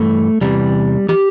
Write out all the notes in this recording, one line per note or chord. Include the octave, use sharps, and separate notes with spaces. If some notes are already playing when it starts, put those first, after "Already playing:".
Already playing: G2 E3 A3
E2 C3 E3 G3
E3 G4